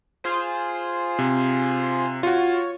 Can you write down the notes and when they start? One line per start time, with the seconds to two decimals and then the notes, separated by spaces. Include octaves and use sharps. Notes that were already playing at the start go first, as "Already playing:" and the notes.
0.24 F4 G#4 C5
1.19 C3
2.23 F4 F#4 C#5